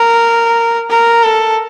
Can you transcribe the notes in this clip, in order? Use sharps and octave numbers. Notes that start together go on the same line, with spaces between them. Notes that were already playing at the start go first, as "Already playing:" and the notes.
Already playing: A#4
A#4
A4